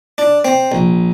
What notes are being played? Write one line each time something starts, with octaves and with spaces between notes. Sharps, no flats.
D4
C4
A#1